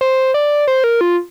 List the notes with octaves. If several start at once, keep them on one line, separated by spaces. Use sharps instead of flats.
C5
D5
C5
A#4
F4